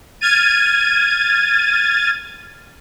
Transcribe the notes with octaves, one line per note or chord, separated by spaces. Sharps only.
F6 G#6 A6 D#7